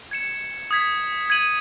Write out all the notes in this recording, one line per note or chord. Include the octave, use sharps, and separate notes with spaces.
G#6 C#7 E7
D#6 G#6 B6
G#6 D#7 F#7